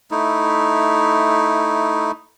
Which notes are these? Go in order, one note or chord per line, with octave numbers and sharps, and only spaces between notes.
A3 D#4 E4